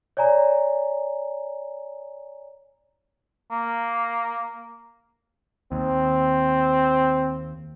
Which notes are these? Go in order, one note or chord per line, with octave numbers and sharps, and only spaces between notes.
C#5 D5 G#5 A#5
A#3
D#2 C4